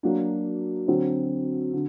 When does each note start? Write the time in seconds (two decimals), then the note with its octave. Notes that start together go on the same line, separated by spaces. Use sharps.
0.03 F#3 A#3 D4
0.88 D3 F#3 C4
1.73 D3